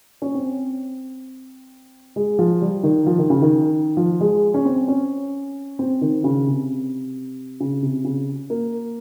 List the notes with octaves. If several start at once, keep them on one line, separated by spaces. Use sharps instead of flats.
C#4
C4
G#3
F3
G3
D#3
F3
D#3
C#3
D#3
F3
G#3
C#4
C4
C#4
C4
D#3
C#3
C3
C#3
C3
C#3
A#3